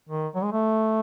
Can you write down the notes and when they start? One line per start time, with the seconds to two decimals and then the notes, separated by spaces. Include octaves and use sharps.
0.09 D#3
0.35 F#3
0.44 G#3
0.52 A3